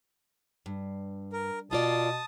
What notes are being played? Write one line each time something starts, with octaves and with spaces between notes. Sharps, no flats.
G2
A#4
B2 A#3 F4 D5 A5 D#6